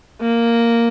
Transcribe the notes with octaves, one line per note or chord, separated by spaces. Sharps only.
A#3